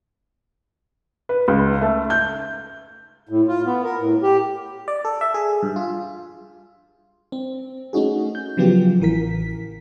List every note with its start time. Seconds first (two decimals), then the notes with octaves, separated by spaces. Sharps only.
1.29 B4
1.48 C#2
1.81 A3
2.10 G6
3.29 A2
3.48 F4
3.66 B3
3.83 A#4
3.97 A2
4.22 G4
4.88 D5
5.05 A4
5.21 E5
5.34 G#4
5.63 G2
5.76 F4
7.32 C4
7.93 A3 C#4 D#4 F#4 G#4
8.35 G6
8.57 C#3 F3 F#3 B3 F4 G4
9.00 A1 E3 A#4 B6